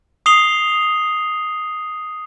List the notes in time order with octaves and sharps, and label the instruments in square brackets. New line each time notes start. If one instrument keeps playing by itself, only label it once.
[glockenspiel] D#6 C7 F7 G7